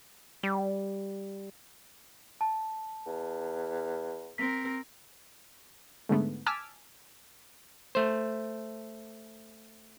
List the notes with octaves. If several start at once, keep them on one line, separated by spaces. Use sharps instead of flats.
G3
A5
E2
C4 A#4 B6
G#2 D3 G#3 A3 B3
G#5 A5 D6 E6 F6 B6
A3 C5